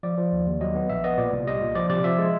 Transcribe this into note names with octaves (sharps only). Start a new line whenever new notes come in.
F3 D5
F3
D#2
D#2
F#3 D#5
B3
A#1 E5
B3 D#5
A#2 D5
C2
G3 D#5
A#2
F3 D5
C3 D5
F3 E5
G#3